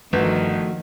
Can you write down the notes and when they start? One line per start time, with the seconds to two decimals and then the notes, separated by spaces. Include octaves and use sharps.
0.13 G1 D#3 F3 A3 F#4 B4